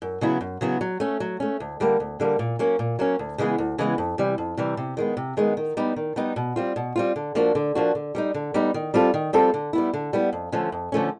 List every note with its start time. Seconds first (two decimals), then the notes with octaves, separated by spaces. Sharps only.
0.02 F#2
0.21 C#3 F#3 B3 E4
0.41 F#2
0.61 C#3 F#3 B3 E4
0.81 F#3
1.00 A3 C#4
1.20 F#3
1.40 A3 C#4
1.60 D2
1.80 D3 G3 A#3
2.00 D2
2.20 D3 G3 A#3
2.39 A#2
2.59 F#3 A#3 C#4
2.79 A#2
2.99 F#3 A#3 C#4
3.19 D2
3.38 C#3 E3 G#3 B3
3.58 D2
3.78 C#3 E3 G#3 B3
3.98 F2
4.18 C3 E3 G3
4.38 F2
4.57 C3 E3 G3
4.77 C3
4.97 D#3 G#3 B3
5.17 C3
5.37 D#3 G#3 B3
5.57 D#3
5.77 G3 B3 D#4
5.96 D#3
6.16 G3 B3 D#4
6.36 B2
6.56 G3 C4 F4
6.76 B2
6.96 G3 C4 F4
7.16 D3
7.35 F3 A#3 D4 F#4
7.55 D3
7.75 F3 A#3 D4 F#4
7.95 D3
8.15 G3 B3 D#4
8.34 D3
8.54 G3 B3 D#4
8.74 D#3
8.94 G3 C4 F4 A4
9.14 D#3
9.33 G3 C4 F4 A4
9.54 D3
9.73 G3 B3 E4
9.93 D3
10.13 G3 B3 E4
10.33 F2
10.52 D3 F3 A3 C#4
10.72 F2
10.92 D3 F3 A3 C#4